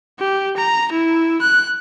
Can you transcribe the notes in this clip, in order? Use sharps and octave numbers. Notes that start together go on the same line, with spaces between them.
G4
A#5
E4
F#6